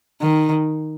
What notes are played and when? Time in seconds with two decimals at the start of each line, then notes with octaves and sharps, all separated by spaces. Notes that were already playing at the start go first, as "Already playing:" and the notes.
0.21 D#3